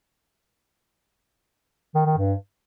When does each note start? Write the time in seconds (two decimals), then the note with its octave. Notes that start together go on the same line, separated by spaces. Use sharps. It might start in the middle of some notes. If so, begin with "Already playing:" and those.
1.95 D#3
2.06 D#3
2.17 G2